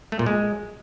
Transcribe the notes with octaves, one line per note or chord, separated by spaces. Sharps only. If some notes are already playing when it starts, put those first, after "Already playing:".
A3
A#2
G#3